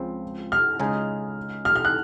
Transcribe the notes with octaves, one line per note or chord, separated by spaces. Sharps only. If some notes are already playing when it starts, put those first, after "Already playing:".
Already playing: C#2 C#3 F3 C4
F6
C#2 C#3 G#3 D#4 G#4
F6
F6
F#6